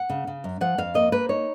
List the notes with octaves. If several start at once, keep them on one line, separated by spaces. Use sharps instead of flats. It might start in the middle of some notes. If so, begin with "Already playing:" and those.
Already playing: F#5
C#3
C#3
F#2
F3 F#5
F2 F5
A#3 D#5
A#3 B4
D#4 C#5